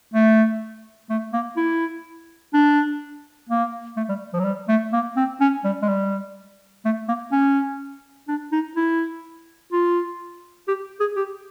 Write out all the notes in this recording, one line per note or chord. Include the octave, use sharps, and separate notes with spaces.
A3
A3
A#3
E4
D4
A#3
A3
G3
F3
F#3
G3
A3
A#3
C4
C#4
G3
G#3
G3
A3
A#3
C#4
D4
D#4
E4
F4
G4
G#4
G4